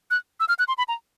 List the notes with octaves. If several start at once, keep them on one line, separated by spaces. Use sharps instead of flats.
F#6
E6
F6
F#6
C6
B5
A#5